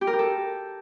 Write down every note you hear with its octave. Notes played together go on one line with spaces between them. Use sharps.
G4
A#4
G4
A4